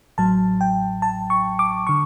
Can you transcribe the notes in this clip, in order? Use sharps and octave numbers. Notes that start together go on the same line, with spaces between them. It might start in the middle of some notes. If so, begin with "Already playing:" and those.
A1 A2 F#3 A5
G5
A5
C#6
D6
D3 C#6